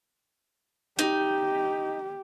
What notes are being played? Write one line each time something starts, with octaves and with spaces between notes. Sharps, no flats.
D#4 G4